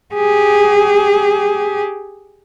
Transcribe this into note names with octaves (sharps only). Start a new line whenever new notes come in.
G4 G#4